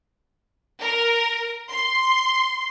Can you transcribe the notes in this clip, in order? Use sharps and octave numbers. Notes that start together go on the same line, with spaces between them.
A#4
C6